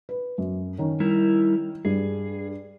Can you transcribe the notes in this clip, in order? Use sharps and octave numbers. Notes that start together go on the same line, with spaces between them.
B4
F#2
D#3 C#4
G3 E4 A#4
G2 G#4